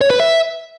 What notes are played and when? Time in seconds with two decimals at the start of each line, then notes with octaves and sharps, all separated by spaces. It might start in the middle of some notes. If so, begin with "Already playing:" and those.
0.01 C#5
0.10 B4
0.20 E5